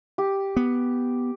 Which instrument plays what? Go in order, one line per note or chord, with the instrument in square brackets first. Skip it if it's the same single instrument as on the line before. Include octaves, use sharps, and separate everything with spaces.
[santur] G4
[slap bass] B3